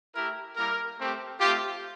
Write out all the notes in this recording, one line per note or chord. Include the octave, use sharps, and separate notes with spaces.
A3 E4 G4 A#4
G3 A#3 E4 A#4
A3 C4 G4
A3 C4 F4 G4